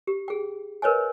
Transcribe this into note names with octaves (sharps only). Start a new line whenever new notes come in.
G4
G#4 G5
A#4 B4 C#5 D#5 G#5